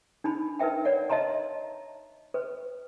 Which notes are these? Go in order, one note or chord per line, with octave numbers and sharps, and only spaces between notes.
D4 D#4 B5
D#4 A#4 B4 E5 G5
C#5 D5 F#5
D#5 E5 A5 A#5 C6
B4